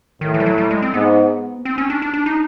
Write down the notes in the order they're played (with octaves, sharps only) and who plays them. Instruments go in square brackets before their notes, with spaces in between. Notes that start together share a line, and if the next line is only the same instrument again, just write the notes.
[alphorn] A2 [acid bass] D#3
[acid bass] E3
G3
F#3
G3
G#3
C4
[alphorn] G#2 [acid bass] B3
[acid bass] C4
C#4
D4
D4
D4
D#4